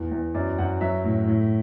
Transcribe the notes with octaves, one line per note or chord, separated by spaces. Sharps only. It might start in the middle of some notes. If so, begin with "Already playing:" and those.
Already playing: E2
E2
F#2 D5
F#2 F#5
F#3 E5
A2
A2